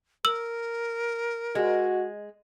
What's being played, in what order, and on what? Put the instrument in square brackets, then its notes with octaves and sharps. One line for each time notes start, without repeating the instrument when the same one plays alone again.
[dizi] A#4 [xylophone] E6 F#7
[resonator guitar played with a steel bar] G#3 [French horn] F#4